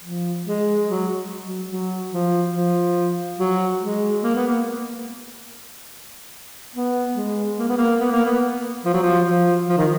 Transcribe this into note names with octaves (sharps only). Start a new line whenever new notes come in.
F3
G#3
F#3
F#3
F#3
F3
F3
F#3
G#3
A#3
B3
A#3
B3
G#3
A#3
B3
A#3
B3
A#3
B3
F3
F#3
F3
F3
F3
D#3